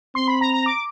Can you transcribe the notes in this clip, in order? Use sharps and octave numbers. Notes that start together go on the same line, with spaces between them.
C4 C6
B5
A#5
A#5
D6